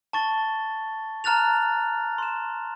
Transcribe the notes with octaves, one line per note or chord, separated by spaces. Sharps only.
A5 C#6 A6 G7
A5 A#5 F6 F#6 A6 F7
C6 E7